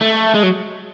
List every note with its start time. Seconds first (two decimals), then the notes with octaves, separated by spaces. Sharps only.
0.01 A3
0.34 G#3
0.43 F#3